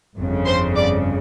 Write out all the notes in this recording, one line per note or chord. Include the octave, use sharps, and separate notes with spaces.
G1 F2 C#3
C5 C6
D5 D6